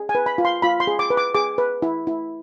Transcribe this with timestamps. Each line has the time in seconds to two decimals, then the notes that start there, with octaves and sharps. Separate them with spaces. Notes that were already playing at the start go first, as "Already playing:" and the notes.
Already playing: G#4
0.09 G#5
0.15 B4
0.26 B5
0.38 F4
0.45 C6
0.62 F4 B5
0.80 C6
0.87 G#4
0.99 D6
1.10 B4
1.17 D6
1.35 G#4 D6
1.58 B4
1.82 E4
2.07 E4